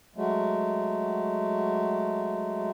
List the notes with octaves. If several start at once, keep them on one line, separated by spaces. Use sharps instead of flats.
F#3 G#3 A3